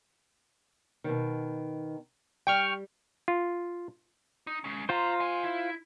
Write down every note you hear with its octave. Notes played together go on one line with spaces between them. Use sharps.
B2 D#3
G3 G5 C#6 F6
F4
D#4
G#3 C#4
F4 C5 G5 A#5
D#5 G#5
E4